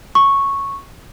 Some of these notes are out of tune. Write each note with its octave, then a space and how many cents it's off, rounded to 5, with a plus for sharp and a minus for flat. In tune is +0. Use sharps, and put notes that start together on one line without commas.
C#6 -5